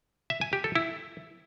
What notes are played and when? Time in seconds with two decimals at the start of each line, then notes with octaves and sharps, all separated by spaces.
0.30 E5
0.41 G#5
0.53 G4
0.64 A4
0.75 E4